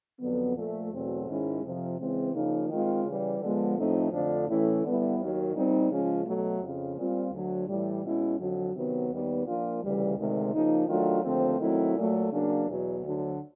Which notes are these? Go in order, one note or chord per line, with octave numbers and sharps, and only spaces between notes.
F2 D3 F#3 B3
A#2 F3 A3
E2 B2 F#3 A3 C4
G#2 D#3 G#3 C#4 E4
F2 C3 F3
C#3 E3 G#3 C4
C#3 F3 A#3 D#4
D#3 G#3 C4 F4
C#3 E3 G3
D3 F3 G#3 B3
A2 F3 A3 C4 D#4
F2 D3 F3 A3 D4
A2 E3 A3 C#4 E4
D3 G3 B3 E4
D#2 D#3 F#3
A#2 G3 C4 D#4
C#3 F3 G#3 C#4 F4
B2 F#3 A3
F2 C#3 F3
A#2 G3 C4 F4
D2 D3 F#3
A2 E3 G3
B2 G#3 C#4 E4
F2 D3 F#3
C3 D#3 F#3 B3
D#2 D#3 G3 B3
A#2 F3 A#3 D4 F4
D2 C#3 E3 G3
D2 C3 D#3 G#3
C#3 F3 A#3 D#4
D#3 F#3 A3 D4 F4
D#2 D3 F3 A3 C4
D#3 F#3 A3 C4 E4
A#2 F#3 A3
C#3 F#3 A#3 D4
E2 B2 F#3
D2 D3 F#3